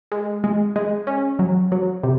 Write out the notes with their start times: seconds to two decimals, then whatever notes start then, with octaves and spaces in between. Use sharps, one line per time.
0.12 G#3
0.44 G#3
0.76 G#3
1.07 C#4
1.39 F#3
1.72 F#3
2.03 C3